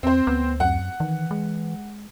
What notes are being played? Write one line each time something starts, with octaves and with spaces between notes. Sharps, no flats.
E2 C4 C5
D2 B3
F#2 F#5
D#3 E3
G#3